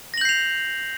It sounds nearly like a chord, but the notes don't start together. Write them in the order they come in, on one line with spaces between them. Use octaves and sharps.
A#6 F#7 G6 C7 F7